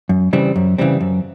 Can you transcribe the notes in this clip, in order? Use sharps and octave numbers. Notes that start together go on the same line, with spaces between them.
F#2
C#3 E3 G3 C4
F#2
C#3 E3 G3 C4
F#2